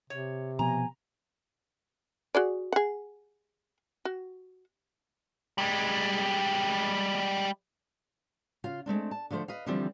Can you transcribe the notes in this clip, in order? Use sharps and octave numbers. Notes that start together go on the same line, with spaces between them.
C3 C#5
B2 F3 B3 G#5 A#5
F#4 G#4 D5
G#4 F#5
F#4
G3 G#3
C#3 F4 F5
G#3 A3 C4 D4
A5
D3 F3 A3 C5
B4 D#5 F5
D3 E3 F3 G3 C4